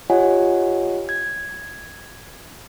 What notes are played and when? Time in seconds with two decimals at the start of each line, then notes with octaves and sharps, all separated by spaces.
0.10 F4 G4 C#5 D#5 F#5 G#5
1.09 G#6